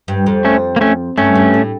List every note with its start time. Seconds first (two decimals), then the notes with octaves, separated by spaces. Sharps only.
0.08 G2
0.26 F2
0.45 A3 C#4
0.76 A#3
0.81 A3 C#4
1.17 G2 A3 C#4
1.35 G2
1.54 A2